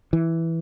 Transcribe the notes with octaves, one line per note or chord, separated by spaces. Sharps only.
E3